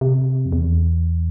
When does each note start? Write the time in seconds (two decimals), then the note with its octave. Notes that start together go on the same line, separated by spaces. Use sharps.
0.01 C3
0.45 F2
0.52 E2